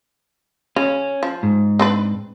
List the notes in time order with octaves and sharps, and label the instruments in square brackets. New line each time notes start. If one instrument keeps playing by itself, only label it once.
[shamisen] C#3 [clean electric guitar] C#4
[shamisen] F3
[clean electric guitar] G#2
[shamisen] C4 D4 B4